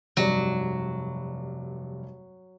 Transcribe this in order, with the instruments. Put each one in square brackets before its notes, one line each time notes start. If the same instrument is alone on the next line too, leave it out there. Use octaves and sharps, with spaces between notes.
[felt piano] F1 G2 D5 [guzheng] F#3